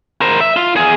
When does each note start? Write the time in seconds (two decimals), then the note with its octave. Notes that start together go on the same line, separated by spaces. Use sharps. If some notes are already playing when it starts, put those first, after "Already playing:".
0.21 A#4 C5
0.41 E5
0.56 F4
0.76 E2 G#4